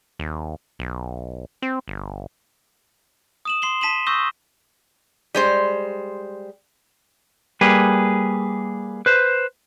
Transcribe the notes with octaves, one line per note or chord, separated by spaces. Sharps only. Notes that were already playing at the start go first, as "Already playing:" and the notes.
D#2
B1
C4
G1
D#6 E7 F#7
C6 C7 F#7 G7
A5 B6 D#7 E7 F#7
C#6 D#6 E6 G6 A#6 G7
G3 G#3 C5
G3 A#3 G#4 B4
B4 C5